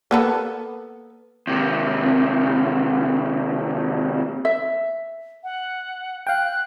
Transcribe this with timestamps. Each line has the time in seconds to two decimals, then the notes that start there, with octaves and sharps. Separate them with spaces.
0.11 A#3 B3 A4
1.47 D#2 C3
4.45 E5
5.44 F#5
6.27 F5 G5 F#6